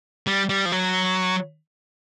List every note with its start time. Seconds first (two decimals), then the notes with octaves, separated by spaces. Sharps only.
0.27 G3
0.49 G3
0.65 F3
0.72 F#3